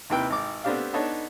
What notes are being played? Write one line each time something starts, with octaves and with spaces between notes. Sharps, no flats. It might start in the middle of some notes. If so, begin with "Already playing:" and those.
D#2 C3 E4 B4 G5
G#1 D6
A3 B3 C4 D4 G4 F5
B3 D4 D#4 A4 C#5